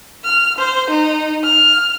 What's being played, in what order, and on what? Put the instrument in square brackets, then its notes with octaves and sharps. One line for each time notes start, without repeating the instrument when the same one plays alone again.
[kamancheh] F6
C5
D#4
F6